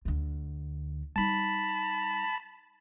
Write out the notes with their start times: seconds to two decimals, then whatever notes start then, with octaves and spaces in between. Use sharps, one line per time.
0.05 D2 D3
1.16 G3 D#4 A5 B5